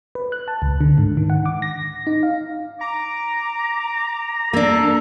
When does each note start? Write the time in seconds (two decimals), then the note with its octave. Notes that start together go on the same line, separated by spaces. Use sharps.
0.15 B4
0.32 F#6
0.48 A5
0.62 C#2
0.81 D3
0.98 G#2
1.17 D#3
1.30 F#5
1.46 D6
1.62 A#6
2.07 D#4
2.23 F5
2.81 A#5 D6
4.53 A#3 D4 A4